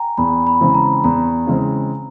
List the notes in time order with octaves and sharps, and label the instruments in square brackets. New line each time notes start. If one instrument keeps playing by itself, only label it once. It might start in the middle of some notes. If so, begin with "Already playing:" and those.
Already playing: [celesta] G5 G#5 A#5
[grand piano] E2 [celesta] B5
[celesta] B5
[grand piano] C#3 E3 G#3 C4
[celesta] A#5
[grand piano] E2 [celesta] A#5
[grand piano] C#3 E3 G#3 C4